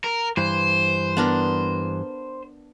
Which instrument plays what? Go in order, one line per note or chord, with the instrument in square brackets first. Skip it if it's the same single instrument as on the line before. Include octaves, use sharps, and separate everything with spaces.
[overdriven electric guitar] A#4
[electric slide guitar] G2 E3 [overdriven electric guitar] C5
[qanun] B3 D4 A#4